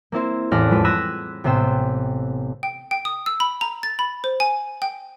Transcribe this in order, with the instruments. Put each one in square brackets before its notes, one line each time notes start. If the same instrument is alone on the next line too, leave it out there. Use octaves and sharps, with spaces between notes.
[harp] A#3 C4 E4 C5
A1 E2 A4 D5 F6 A#6
F2 G#3 B4
B5 E6 F#6 G#6 A#6 D#7
A1 C3 B3 C5 G5 E6
[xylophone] G5
G5
D#6
E6
B5
A#5
A6
B5
C5
G#5
G5